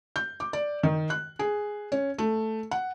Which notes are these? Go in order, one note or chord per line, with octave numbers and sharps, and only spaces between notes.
G6
D6
D5
D#3
F#6
G#4
C#4
A3
F#5